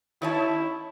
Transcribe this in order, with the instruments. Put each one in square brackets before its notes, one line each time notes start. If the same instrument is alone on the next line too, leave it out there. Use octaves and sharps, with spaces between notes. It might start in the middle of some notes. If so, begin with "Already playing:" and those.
[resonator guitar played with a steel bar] D#3 C#5 A5 [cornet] E4